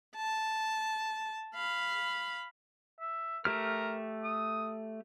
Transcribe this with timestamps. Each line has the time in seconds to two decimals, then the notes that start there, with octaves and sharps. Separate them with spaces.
0.16 A5
1.55 F5 B5
3.00 E5
3.45 A3 G4 A#4 F6
4.24 D#6